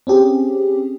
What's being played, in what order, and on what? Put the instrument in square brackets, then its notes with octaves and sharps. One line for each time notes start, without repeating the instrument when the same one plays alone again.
[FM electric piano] C4 C#4 G4 G#4